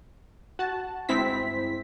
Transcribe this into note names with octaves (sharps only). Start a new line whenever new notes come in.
F#4 A5
G1 G#3 C4 E4 B6